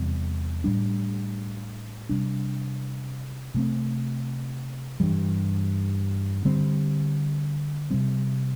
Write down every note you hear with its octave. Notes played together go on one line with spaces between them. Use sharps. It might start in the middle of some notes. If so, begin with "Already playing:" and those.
Already playing: E2 C3 G3
A2 G3 D4
C3 G3 D4
C3 A3 C4
G2 E3 G3
D3 G3 C4
C3 G3 C4